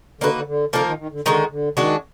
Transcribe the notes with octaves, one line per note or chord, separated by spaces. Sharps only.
D3 A#3 D#4 F#4 B4
D3
D3
D3 F3 A#3 D#4 A#4
D#3
D#3
D3
D3 D#3 G#3 D#4 F#4
D3
D#3 G#3 D4 F#4